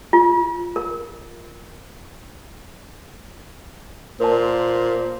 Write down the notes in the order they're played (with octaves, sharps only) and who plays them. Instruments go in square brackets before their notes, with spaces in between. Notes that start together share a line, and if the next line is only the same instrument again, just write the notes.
[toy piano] F4
A#4
[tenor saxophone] A#2 [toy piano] A#4 A5 [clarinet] C5